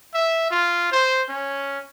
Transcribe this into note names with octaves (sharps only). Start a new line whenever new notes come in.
E5
F4
C5
C#4